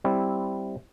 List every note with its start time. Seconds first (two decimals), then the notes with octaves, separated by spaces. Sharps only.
0.04 G3 C4 E4